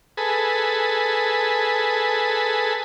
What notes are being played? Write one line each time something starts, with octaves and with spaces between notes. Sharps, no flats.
G#4 A4 B4